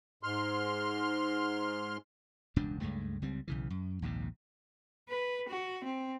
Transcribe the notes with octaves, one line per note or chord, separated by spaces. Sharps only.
G#2 C6 F6
E1 C#2 G2 D4
C#2 G2 G#3 A3
C#2 G3 C4
B1 C#3 E3
F#2
A#1 D#2 G#2 C3
B4
F#4
C4